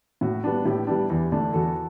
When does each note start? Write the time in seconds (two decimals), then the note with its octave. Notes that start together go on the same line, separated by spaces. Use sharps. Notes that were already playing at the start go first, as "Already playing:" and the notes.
0.21 A2 F#4
0.44 G3 B3 D4
0.65 A2 E4 G4
0.87 G3 B3 D4
1.10 E2
1.32 D3 A3 D4
1.53 E2 F#4 A4